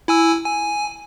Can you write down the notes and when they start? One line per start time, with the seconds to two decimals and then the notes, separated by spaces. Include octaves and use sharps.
0.08 E4 G#5 E6
0.44 G#5